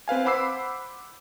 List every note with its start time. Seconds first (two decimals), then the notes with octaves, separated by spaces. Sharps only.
0.08 C4 B4 F5 G#5
0.25 C5 F#5 B5 D6 E6 C7